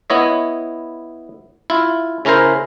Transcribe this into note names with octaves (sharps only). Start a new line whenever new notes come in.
B3 E4 C#5 D#5
E4 F4
C#3 C#4 E4 A#4 C5